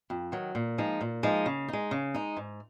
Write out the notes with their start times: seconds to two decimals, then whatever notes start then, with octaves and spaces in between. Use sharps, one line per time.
0.10 F2
0.32 D#3 F#3
0.55 A#2
0.78 F3 G#3 D#4
1.01 A#2
1.23 F3 G#3 D#4
1.46 C#3
1.68 G#3 D#4
1.91 C#3
2.14 G#3 D#4
2.37 G#2